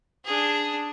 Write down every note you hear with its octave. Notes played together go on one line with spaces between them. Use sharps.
D4 G#4